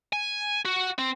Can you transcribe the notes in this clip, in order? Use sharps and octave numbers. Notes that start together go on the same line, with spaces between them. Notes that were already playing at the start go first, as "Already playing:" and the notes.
G#5
F#4
C4